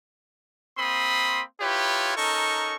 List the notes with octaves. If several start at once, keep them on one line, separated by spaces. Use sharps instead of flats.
A#3 C4 B5 C6 D#6
E4 F4 G4 B4 C#5
C#4 D#4 A4 A#4 C#6